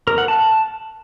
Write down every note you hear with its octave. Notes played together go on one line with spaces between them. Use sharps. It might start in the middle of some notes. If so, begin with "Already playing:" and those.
A#4
F#5
A5